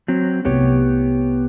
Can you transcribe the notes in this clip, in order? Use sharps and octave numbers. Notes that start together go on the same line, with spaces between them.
F#3 C4
C2 A3 B3 G4 C#5